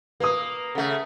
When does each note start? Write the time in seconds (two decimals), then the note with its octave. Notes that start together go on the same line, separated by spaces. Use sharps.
0.20 A#3 B4 D#6
0.75 C#3 A3 A4 E5 F#5